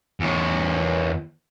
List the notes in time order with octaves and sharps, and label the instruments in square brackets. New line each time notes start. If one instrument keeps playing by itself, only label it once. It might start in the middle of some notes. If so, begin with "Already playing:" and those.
[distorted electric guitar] E2 C#5